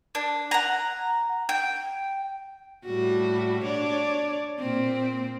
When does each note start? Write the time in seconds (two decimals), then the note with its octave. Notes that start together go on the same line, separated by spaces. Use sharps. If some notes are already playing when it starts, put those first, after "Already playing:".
0.15 D4
0.51 F#5 A#5
1.49 G5
2.85 A2 G3 F#4
3.64 D4 C#5 D5
4.59 A#2 C4